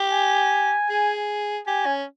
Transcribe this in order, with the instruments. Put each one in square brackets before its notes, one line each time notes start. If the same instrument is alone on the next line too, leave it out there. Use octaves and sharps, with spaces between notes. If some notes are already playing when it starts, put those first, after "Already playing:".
Already playing: [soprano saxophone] G4
[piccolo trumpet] G#5
[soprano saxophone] G#4
[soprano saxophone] G4 [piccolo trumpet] G#5
[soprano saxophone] C#4